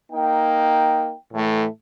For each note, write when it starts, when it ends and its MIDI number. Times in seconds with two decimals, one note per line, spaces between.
0.12 1.14 58
0.12 1.14 63
0.12 1.14 79
1.34 1.66 45
1.34 1.66 52
1.34 1.66 57